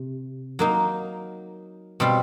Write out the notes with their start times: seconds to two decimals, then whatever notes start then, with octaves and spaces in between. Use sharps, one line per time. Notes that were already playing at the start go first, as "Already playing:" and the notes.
Already playing: C3
0.59 F#3 A#3 D#4
2.00 B2 G3 C4 F4